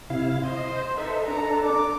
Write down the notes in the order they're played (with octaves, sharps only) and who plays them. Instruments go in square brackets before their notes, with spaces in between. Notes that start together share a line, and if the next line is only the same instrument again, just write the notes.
[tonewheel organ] C3 E4 F5
[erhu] C5 [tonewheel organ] D#5
[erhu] D#4 [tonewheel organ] A4 B4 E5
[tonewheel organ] D4 A4 [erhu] A#5
[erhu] D6